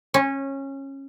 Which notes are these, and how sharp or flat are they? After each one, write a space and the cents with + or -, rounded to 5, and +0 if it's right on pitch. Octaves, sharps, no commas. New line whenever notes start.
C#4 -20